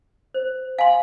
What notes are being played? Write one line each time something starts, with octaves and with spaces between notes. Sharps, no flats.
C5
F5 G#5 C6